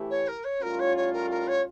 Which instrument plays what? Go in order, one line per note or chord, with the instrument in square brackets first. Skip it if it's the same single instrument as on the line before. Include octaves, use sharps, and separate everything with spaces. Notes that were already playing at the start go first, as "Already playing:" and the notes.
Already playing: [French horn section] A2 E3 A3 E4 G4
[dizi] C#5
A#4
C#5
[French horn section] A2 G3 C#4 F4 [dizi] A#4
[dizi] C#5
C#5
A#4
A#4
C#5